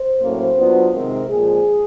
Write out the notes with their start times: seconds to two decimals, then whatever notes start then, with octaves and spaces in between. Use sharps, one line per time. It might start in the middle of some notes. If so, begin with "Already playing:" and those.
Already playing: C5
0.20 A2 F#3 A#3 C#4
0.57 F#3 B3 D4 F4
0.94 C3 D#3 G#3 C4 A#4
1.31 A#2 F3 G#3 G#4